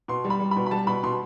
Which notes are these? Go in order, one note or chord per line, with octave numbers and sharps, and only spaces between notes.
B2 C6
G3
B5
G3
B5
B2
B5
G3 A5
B2 B5
B2 C6